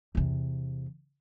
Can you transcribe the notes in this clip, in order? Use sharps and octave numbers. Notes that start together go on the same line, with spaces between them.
E2 C3